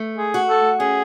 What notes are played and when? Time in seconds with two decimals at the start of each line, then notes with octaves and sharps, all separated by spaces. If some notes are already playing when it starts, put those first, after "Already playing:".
Already playing: A3
0.18 G#4
0.34 F#4
0.49 A4
0.80 C#4 G#4